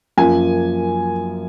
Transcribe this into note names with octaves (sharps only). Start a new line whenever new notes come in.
F#2 F3 A#3 G#5